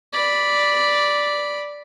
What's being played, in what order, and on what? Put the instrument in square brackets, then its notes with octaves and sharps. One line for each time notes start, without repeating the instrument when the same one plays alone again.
[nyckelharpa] D5 B5